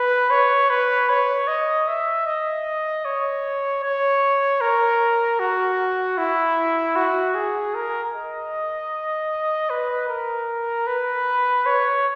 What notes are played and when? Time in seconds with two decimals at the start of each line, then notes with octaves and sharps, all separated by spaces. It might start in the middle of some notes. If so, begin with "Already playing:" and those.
Already playing: B4
0.31 C#5
0.70 B4
1.09 C#5
1.48 D#5
1.88 E5
2.26 D#5
3.05 C#5
3.83 C#5
4.61 A#4
5.40 F#4
6.18 E4
6.96 F#4
7.35 G#4
7.75 A#4
8.14 D#5
9.70 B4
10.09 A#4
10.87 B4
11.66 C#5